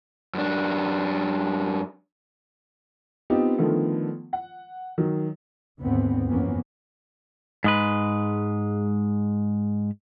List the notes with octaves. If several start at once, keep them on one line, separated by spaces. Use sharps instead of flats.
F#2 D4
B3 C4 D#4 F4 G4
D3 D#3 F3 A3 B3
F#5
D#3 F#3
G#1 D#2 D3 B3 C4
F#1 F2 E3 A#3 B3 C#4
G#2 G#3 B4